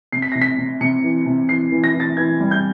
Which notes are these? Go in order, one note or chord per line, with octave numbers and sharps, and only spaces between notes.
C3 C7
B6
C3 A#6
B6
C3
C3 C#7
E3
C3
E3 C7
E3
A#6
E3
A6
E3 G#6
G3
G6